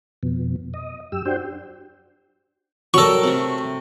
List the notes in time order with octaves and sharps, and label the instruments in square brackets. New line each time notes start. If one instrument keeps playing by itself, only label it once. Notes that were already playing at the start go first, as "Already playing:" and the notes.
[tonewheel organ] F2 B2
D#5
F#2 G4 E6
D4 F#4 G4 C5 G5
[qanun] F#3 G3 A#4 [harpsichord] A4 C#6
[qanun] C3 A3